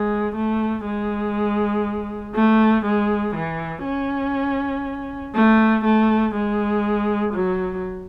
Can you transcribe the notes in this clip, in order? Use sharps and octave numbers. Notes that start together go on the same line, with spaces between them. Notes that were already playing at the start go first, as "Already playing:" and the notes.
Already playing: G#3
A3
G#3
A3
G#3
E3
C#4
A3
A3
G#3
F#3